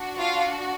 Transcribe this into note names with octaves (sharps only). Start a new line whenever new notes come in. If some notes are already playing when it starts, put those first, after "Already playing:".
Already playing: D4 F#4
F4 F5